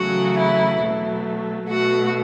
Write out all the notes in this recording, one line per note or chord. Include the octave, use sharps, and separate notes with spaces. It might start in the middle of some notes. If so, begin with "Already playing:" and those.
Already playing: E2 C#3 F#3 A3 F#4
E4
B2 F#3 A3
B2 A3 F#4